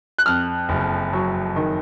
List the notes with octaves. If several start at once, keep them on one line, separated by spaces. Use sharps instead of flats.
F#6
F2 F6
F#1
F#3
D#3